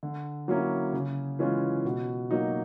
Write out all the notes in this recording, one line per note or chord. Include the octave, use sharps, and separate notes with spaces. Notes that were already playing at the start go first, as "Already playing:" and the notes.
D3
F#3 A#3 C#4 E4
C#3
E3 G#3 C#4 F4
B2
F#3 A#3 D#4